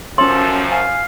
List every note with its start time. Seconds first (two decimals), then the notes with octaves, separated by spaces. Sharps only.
0.18 F#2 F3 C#4 A4 C#5 C6
0.72 F5 G#5